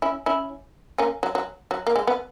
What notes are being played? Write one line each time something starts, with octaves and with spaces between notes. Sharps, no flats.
C#4 E4
C#4 E4
A#3 C#4
F#3
F#3
F#3
A#3
G#3
B3